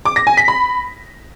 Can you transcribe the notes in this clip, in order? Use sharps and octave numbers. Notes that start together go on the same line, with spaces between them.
D6
A#6
G#5
B6
B5